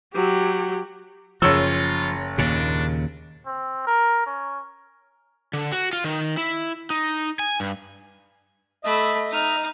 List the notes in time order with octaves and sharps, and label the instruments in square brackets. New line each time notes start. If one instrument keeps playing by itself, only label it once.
[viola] F#3 G4
[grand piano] F#1 C#5 E6 [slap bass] F3 [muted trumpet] F4
[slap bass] D#2 A#2 C#3 [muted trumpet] D4
[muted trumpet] C4
A#4
C#4
[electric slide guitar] D3
F#4
F4
D#3
E4
D#4
G#5
G2
[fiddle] A3 B5 [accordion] D#5 E5 D#6
[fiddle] D#4 F6